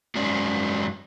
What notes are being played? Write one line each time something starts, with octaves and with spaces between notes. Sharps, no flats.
F#2 F#3 G#3 C#4 D5